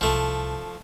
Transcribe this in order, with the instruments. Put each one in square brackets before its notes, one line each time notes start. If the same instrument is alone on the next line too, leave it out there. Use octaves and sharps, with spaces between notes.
[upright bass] C2 [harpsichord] F3 A3